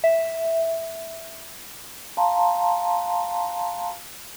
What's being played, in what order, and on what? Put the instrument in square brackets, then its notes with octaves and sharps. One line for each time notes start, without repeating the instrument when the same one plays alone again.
[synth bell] E5
[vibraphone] F5 A5 A#5 C6